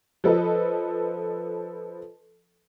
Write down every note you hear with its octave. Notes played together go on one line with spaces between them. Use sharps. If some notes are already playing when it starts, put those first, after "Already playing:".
F3 A4 B4 D#5